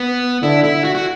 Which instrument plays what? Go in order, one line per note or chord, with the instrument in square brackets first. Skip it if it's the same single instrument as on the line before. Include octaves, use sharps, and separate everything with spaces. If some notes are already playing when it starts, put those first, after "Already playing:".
Already playing: [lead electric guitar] B3
[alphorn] D3 [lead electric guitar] E4
[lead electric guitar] E4
F#4
F#4